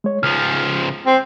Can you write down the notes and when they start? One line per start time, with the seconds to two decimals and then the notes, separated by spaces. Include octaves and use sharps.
0.04 G#3 C#5
0.23 C#2 F3 F6
1.06 C4